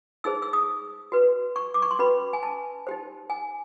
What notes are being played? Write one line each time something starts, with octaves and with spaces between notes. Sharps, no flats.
D#4 G#4 C5 E6
E6
D#6
F#4 B4
C#6
D6
C#6
C6
C#4 F#4 B4 B5
G#5
A5
D#4 G4 C5
G#5